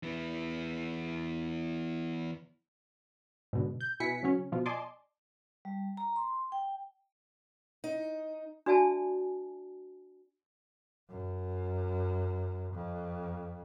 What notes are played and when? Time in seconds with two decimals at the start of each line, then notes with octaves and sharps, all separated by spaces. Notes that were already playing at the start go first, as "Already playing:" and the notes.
0.03 E3 B3
3.53 G#2 B2 D3
3.81 G6
4.00 B2 E4 B4 G#5 B6 C#7
4.23 C#3 F#3 C#4
4.52 B2 F3 F4
4.66 D5 D#5 G#5 A5 C6 D6
5.65 G3
5.97 A#5
6.16 C6
6.52 G5
7.84 D#4
8.66 D4 F#4 D5 E5 G#5 A5
11.10 F#2
12.74 F2